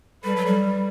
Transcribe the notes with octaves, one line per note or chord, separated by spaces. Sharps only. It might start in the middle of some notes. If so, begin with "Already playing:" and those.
G3 A4 B4
F#3
G3